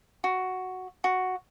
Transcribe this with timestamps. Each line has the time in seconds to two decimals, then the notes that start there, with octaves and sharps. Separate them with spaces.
0.24 F#4
1.04 F#4